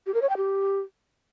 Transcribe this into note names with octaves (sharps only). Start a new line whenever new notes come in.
G4
A#4
C#5
G5
G4